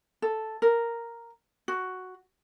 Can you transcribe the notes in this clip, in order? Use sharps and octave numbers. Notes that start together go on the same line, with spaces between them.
A4
A#4
F#4